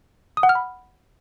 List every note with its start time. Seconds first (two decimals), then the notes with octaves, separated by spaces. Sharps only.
0.37 D#6
0.43 F#5
0.49 F6
0.55 B5